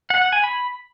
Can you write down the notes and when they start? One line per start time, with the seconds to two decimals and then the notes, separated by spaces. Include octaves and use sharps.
0.10 F#5
0.21 F#5
0.33 G#5
0.44 B5